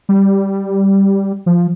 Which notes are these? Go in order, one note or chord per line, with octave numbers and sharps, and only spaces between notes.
G3
F3